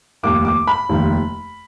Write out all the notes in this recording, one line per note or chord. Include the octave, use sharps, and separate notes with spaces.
F1 D#2 D#3 D6
D6
B5
F1 D#2 D#3